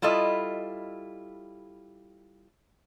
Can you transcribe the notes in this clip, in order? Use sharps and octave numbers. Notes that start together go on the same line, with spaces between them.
G3 E4 F4 A4 D#5